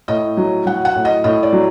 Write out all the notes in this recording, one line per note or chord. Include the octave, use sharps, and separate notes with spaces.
A2 D#5
F#3
F#3 F#5
F#5
A2
D#5
A2 D#5
D5
F#3